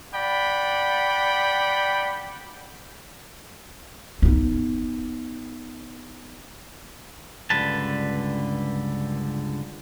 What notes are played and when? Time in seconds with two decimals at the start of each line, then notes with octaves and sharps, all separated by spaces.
0.14 D5 F#5 G5 B5
4.22 B3 D#4
7.50 C#2 G2 D3 B4 A5